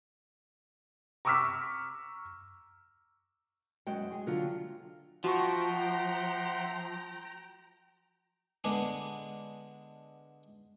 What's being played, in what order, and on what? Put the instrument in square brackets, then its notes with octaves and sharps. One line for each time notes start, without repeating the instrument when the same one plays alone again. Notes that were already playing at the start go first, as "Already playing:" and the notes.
[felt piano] A#5 C#6 D6 E6 F6 B6
[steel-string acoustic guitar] F#2 G#3 F#4 G5
G#4
D3 F#3 F4
[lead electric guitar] F3 [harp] F#4 C#6 [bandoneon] E5 F#5 C6 [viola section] G5 A#5
[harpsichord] D3 G#3 B3 D4 G#4